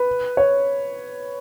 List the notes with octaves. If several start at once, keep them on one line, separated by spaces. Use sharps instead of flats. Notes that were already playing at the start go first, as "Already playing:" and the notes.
Already playing: B4
C#5